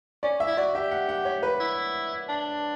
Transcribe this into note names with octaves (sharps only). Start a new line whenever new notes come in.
C#4 D5
E5
E4
F#4 D5
G4 E5
F#5
F#5
C#5
B4
E4
D4